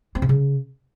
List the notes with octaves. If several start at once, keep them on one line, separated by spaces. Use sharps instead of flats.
C4
C3
C#3